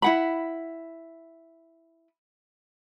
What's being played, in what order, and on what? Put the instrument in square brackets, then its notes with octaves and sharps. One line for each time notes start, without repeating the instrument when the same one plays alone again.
[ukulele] E4 F#5 B5